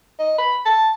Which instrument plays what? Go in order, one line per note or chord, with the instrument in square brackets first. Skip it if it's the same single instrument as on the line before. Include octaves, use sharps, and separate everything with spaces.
[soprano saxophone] D#5
B5
A5